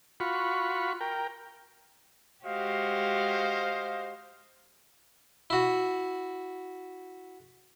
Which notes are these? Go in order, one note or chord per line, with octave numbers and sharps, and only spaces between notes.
F4 F#4 B5 C#6
A#4 G5
G#3 F#4 G4 C5 D#5 F5
E4 F#4